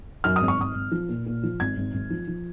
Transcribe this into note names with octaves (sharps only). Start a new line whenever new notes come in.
F#2 F6
D#6
G#1
C#6
G#1 D#6
G#1
F3
A#2
A#2
F3
G#1 G#6
G#1
G#1
F3
F3